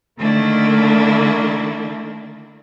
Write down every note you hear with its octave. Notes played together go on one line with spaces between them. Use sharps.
D3 D#3 A3 A#3 D4 E4